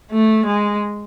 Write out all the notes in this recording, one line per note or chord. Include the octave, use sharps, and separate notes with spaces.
A3
G#3